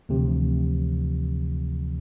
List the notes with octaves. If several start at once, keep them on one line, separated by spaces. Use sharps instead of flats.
D2 C3 E3 F3